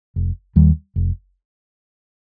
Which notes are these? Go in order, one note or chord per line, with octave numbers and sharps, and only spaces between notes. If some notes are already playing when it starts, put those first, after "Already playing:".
F1
D#2 D#3 G3
F1